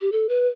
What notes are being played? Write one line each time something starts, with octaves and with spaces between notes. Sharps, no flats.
G4
A4
B4